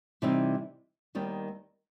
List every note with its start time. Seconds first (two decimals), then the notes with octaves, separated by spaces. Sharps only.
0.22 C3 E3 G3 C4 D#4
1.15 D#2 D#3 G3 B3